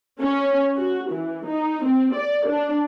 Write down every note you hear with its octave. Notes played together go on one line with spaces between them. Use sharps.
C#4
F#4
E3
D#4
C4
D5
D4